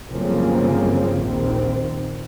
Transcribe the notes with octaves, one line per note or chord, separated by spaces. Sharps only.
G1 C#3 F3 F#3 A#3 C4
A#1 D#2 A#2 D#3 C4